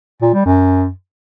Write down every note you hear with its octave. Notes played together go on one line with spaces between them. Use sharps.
A#2
G3
F#2